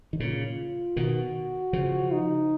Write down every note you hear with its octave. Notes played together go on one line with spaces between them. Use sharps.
D#3
A#2 C#3 F4
B2 D#3 F#4
C#3 F3
D#4